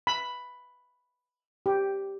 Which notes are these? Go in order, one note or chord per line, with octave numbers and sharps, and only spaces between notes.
B5
G4